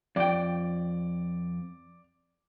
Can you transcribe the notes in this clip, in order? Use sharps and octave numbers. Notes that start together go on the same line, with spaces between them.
F2 D5 G5